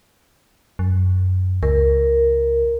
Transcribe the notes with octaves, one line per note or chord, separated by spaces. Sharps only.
F#2
C#2 A#4